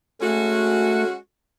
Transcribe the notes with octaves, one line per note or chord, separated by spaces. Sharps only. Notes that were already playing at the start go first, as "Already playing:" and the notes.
G#3 A3 C#4 F#4